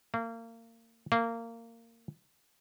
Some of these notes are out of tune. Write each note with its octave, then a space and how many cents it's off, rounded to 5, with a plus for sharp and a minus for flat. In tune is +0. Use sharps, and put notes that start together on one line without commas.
A#3 -30
A#3 -20